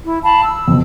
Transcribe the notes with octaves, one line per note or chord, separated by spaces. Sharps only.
E4
F5 A5 B5
E6
F2 B2